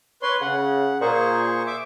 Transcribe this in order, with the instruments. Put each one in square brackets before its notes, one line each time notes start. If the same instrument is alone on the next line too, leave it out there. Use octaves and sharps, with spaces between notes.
[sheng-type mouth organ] B4 C6 [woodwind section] C#5
[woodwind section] C#3 [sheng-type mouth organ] F#5
[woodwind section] A#2 [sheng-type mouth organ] G#4 C5 C#6
[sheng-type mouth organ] E5 D6